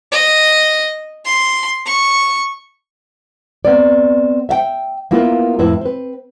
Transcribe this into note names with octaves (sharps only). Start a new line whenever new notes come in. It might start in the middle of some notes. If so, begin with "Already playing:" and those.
D#5
C6
C#6
B3 C4 D5
E5 F5 G5
A#3 B3 E4 F4 A#4 B4
F2 A2 E4 B4 E5
C4 B4